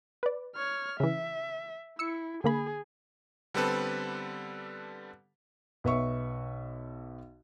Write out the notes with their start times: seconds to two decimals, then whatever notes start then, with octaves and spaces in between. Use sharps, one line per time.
0.23 B4 D5
0.55 C#5 F6
1.00 C#3 E3 E5
1.99 E4 E6 C#7
2.44 D3 A#3 G#4 B5
3.54 D3 G3 B3 C4 A4 B4
5.84 B1 B4 E5 C#6